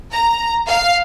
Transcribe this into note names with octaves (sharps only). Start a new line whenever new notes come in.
A#5
F5